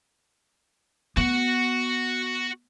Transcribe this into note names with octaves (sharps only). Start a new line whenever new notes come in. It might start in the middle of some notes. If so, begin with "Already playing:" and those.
B3 F#4 F#5